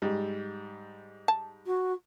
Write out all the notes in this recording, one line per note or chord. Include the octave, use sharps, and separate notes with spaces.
G#2 G3
A5
F#4